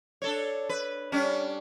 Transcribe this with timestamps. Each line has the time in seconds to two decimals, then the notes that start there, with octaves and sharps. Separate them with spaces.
0.22 D4 A4 C#5
0.69 B4
1.12 G3 C#4 D4